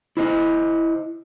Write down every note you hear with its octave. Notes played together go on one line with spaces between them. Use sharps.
E4 C5 D#5